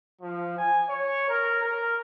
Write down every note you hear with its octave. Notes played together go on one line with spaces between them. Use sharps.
F3
G#5
C#5
A#4
A#4